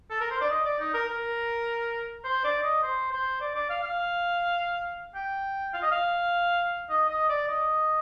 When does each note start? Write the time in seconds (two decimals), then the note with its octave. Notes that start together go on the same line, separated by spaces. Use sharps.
0.10 A4
0.21 A#4
0.31 C5
0.41 D5
0.50 D#5
0.65 D5
0.79 D#4
0.94 A#4
1.08 A#4
2.24 C5
2.44 D5
2.63 D#5
2.83 C5
3.12 C5
3.41 D5
3.55 D5
3.70 F5
3.84 F5
5.15 G5
5.73 F5
5.82 D#5
5.91 F5
6.90 D#5
7.09 D#5
7.29 D5
7.48 D#5